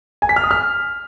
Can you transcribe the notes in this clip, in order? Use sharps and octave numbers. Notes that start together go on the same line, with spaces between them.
G#5
B6
F6
D#6
F6